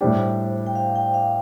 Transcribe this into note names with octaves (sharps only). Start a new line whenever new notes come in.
A2 G3 D4 G4 C5
G5
F5
G5
F5